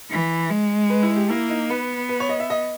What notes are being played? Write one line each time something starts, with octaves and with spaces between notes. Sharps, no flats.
E3
G#3
B4
E4
G4
A#3 E4
D#4
B3 B4
B4
C#5
D#5
E5
D#5